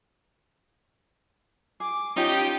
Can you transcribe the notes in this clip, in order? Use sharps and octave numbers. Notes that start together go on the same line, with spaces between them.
G#4 D6
C#4 D#4 F4 G4 G6